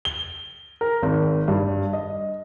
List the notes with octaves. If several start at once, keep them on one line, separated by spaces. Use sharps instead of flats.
G7
A#4
G#1
G2
D#5